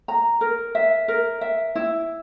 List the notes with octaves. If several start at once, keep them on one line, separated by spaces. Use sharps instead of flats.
A#5
A#4
E5
A#4
E5
E4